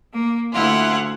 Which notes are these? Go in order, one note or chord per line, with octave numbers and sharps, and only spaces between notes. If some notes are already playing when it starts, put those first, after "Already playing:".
A#3
D2 E4 F4 F#5